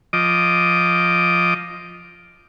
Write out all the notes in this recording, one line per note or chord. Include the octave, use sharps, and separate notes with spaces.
F3 D#5 D6